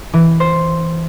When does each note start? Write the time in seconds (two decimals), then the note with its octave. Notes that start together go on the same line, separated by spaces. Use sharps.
0.14 E3
0.40 C5